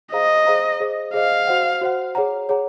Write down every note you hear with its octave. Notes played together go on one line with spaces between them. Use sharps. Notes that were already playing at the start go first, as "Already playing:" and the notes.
G#4 C5 D#5 F5 A#5
G#4 C5 F5 A#5
G#4 C5 D#5
G#4 C5 D#5 F5
F#4 C5 F#5
F#4 C5 F#5
G#4 C#5 F#5 A#5
G#4 C#5 F#5 A#5